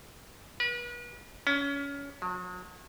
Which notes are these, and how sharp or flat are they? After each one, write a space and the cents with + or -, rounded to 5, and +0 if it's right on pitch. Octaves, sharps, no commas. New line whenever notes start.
B4 -40
C#4 +25
F#3 -40